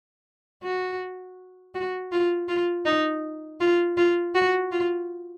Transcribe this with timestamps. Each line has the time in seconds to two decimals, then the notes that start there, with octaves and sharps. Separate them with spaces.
0.63 F#4
1.74 F#4
2.12 F4
2.48 F4
2.85 D#4
3.60 F4
3.97 F4
4.35 F#4
4.72 F4